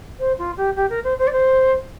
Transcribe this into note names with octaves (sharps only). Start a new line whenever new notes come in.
C5
F4
G4
G4
A#4
C5
C5
D5
C5